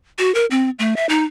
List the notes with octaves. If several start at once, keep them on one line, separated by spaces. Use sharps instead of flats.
F#4
A#4
C4
A3
E5
D#4